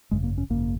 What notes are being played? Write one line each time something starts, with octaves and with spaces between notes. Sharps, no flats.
G#1 F#2 C#3 G#3
A#3
C#4
G#1 F#2 C#3 A#3